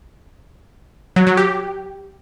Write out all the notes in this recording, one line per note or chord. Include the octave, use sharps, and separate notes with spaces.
F#3
F#3
G4